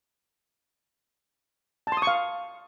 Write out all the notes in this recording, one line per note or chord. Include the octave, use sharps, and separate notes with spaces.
A5
C6
D#6
C#6
F5